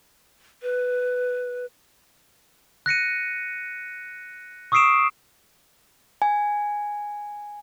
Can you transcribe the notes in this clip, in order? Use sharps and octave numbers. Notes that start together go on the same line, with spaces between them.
B4
F#6 A#6 C#7 D#7
C#6 D#6 E6 C7 D7 E7
G#5